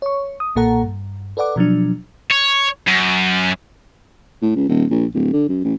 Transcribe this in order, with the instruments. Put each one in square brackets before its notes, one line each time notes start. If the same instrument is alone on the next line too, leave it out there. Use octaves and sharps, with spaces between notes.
[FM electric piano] C#5 C#6
D#6
B1 A#2 A#3 A4 F#5 A#5
G2
A4 B4 D5 F#5 D6
B2 F3 F#3 D4
[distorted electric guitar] C#5
F#2
[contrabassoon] A2
C#2
D#1
A#1
D1
D3
F#2
A1